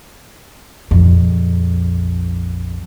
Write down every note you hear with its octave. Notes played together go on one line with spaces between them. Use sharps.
A#1 F2